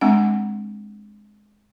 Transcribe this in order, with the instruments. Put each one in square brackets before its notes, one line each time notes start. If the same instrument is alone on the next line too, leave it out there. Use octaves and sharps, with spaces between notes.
[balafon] G#3 C4 D4 F#5